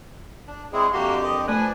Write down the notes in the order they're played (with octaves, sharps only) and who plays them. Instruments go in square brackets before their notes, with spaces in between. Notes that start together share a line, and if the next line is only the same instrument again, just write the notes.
[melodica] D4
[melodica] G#3 E4 [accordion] C4 G#4 [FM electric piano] D5 E5 C#6
[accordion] F2 D3 G4 [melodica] A#3 F#4 C6
[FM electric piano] A#4 [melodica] D#5
[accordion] F3 D4 [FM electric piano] A3 D5 F#6 [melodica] B4 G#5